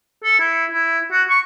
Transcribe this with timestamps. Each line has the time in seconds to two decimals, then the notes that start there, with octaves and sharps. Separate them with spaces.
0.24 A4
0.39 E4
0.72 E4
1.12 F#4
1.30 C#6